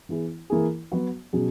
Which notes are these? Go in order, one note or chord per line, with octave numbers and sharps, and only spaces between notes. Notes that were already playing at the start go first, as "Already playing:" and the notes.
E3 B3 E4 G#4
E3 A#3 E4 G#4
F#3 B3 F#4
B2 F#3 C#4 G#4